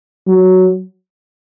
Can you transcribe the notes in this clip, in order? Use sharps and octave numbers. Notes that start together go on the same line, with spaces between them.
F#3